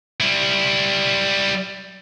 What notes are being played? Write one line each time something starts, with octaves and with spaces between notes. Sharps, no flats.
G3 E4